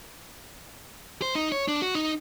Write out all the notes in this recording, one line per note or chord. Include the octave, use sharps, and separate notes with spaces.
C5
D#4
C#5
D4
F#4
D#4